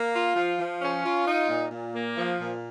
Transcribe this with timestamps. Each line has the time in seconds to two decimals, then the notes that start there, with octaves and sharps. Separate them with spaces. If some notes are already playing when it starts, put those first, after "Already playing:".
Already playing: A#3
0.14 F4
0.36 F3
0.59 F3
0.81 C#4
1.03 F4
1.27 D#4
1.49 A#2
1.71 A#2
1.94 A#3
2.17 F3
2.40 A#2